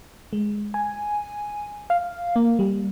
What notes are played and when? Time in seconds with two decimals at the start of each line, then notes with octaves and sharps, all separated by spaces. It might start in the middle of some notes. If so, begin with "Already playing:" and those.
0.33 G#3
0.74 G#5
1.90 F5
2.36 A#3
2.59 G3